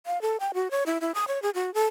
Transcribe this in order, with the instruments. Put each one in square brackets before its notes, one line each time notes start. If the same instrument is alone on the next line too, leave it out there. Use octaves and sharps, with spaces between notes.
[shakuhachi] F5
A4
G5
F#4
C#5
E4
E4
D#6
C#5
G#4
F#4
A4